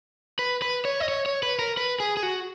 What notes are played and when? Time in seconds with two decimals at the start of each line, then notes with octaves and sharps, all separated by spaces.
0.39 B4
0.62 B4
0.85 C#5
1.00 D#5
1.08 C#5
1.26 C#5
1.43 B4
1.59 A#4
1.77 B4
2.00 G#4
2.17 G#4
2.23 F#4